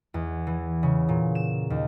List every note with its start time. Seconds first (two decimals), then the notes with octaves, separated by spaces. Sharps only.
0.14 E2
0.47 E3
0.83 C#3
1.09 A#2
1.35 E7
1.70 D#2